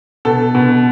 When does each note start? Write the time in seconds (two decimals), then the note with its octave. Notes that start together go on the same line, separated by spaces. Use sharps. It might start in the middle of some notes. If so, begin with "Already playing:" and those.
0.25 B2 A4
0.55 B2